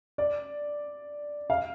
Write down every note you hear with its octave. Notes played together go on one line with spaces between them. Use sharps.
D5
F5